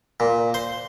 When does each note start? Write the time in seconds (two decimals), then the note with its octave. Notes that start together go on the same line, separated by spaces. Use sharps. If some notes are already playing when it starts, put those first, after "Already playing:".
0.20 A#2
0.54 C5